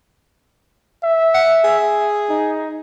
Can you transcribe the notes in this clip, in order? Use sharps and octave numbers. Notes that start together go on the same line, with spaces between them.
E5
F#5
G#4
D#4